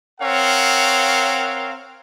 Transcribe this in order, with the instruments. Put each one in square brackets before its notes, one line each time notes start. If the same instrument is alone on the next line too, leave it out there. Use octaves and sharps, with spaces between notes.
[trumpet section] C4 A#4 C#5 F5 F#5